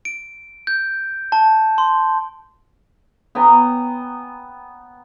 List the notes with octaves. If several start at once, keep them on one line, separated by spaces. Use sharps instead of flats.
D7
G6
A5
C6
B3 G5 G#5 A#5